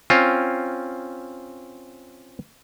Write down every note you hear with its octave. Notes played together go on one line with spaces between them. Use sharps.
C4 C#4 F4